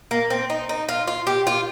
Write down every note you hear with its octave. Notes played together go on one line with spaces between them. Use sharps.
A#3
C4
D#4
D#4
F4
F4
G4
F4